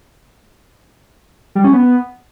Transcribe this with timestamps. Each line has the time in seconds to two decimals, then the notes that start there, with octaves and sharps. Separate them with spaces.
1.55 G3
1.64 C#4
1.73 B3